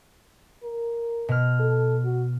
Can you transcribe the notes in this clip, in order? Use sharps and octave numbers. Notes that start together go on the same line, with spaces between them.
A#4
B2 F6
A4
F#4